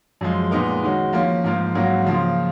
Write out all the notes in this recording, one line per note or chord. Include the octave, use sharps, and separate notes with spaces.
F#2 F3 G#3
A#2 G#3 B3 D#4 A#4
D#3 G#3 C#4 F#4
F3 A#3 C#4
G#2 F3 A#3 F4
G#2 F#3 A#3 C#4 F#4
C#3 F3 A#3 F4